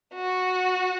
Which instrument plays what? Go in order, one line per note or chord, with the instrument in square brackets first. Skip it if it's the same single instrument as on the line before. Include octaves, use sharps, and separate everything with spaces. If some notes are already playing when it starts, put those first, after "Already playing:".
[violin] F#4